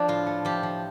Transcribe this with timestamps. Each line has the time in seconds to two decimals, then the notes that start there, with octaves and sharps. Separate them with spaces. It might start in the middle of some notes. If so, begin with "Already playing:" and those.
Already playing: F3 D4
0.08 A2 F4
0.27 A3
0.45 F3 G4
0.63 F3